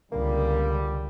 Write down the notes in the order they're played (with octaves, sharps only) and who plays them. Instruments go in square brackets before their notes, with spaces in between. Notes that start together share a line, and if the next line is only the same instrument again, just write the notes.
[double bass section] C#2 [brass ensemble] D3 G3 [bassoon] A#3